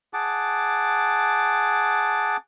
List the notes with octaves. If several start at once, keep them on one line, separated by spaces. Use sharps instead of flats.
G#4 F#5 A5 D6